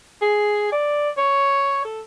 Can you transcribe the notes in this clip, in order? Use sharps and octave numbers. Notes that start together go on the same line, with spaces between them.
G#4
D5
C#5
A4